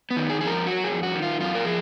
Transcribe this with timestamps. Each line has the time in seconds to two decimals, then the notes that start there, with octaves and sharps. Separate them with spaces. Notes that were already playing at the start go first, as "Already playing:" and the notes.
0.11 B3
0.17 D#3
0.30 G#4
0.41 F2 G#4
0.47 A#4
0.66 F#3 F#4
0.84 G#4
0.91 F2
1.03 F#4
1.15 D#3
1.22 F4
1.41 F#2 F4
1.55 A#4
1.65 F3 G#4